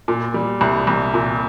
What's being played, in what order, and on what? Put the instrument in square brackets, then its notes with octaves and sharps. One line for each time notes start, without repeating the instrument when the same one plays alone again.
[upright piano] A#2
G3
C2
C2
A#2